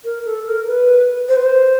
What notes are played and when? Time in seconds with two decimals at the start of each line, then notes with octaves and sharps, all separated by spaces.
0.04 A#4
0.25 A4
0.46 A#4
0.67 B4
1.28 C5
1.36 B4
1.44 C5